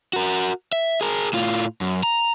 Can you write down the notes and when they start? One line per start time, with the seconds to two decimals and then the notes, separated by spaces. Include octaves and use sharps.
0.13 F#4 A#4
0.72 E5
1.01 G#4 A#4
1.33 A2 F4
1.81 F#2
2.03 A#5